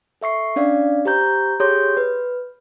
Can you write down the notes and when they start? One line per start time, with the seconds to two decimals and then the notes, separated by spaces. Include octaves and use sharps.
0.21 A4 E5 C#6 C7
0.56 C#4 D4 D5 F5
1.05 G4 C5 A#5 G6
1.60 G4 G#4 C#5 C6 D#6 G6
1.97 B4